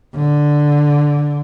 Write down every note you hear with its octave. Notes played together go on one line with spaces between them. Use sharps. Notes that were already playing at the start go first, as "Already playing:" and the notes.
D3